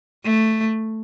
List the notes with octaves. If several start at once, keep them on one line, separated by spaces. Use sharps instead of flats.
A3